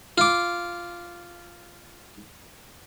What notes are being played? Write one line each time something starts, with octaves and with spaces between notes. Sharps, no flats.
F4 D6